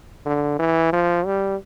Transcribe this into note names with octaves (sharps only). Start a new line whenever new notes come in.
D3
E3
F3
G3